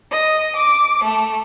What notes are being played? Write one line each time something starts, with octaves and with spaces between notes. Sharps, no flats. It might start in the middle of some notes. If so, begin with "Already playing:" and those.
D#5
D6
A3